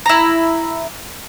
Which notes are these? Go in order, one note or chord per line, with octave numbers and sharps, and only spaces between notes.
E4 A#5